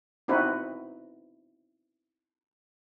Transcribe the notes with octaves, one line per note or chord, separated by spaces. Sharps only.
B3 C4 D#4 E4 F#4 B4